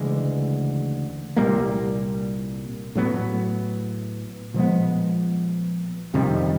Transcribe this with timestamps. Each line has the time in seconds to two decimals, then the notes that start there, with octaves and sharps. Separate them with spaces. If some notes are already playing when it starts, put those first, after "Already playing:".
Already playing: D2 C#3 E3 G#3
1.36 C2 A#2 G3 A#3
2.95 A2 F#3 B3
4.54 A#2 F3 G#3 B3
6.14 F2 C3 D#3 G3